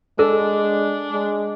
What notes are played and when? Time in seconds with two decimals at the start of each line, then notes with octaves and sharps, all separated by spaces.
0.19 G#3 D4 A4
1.12 G#3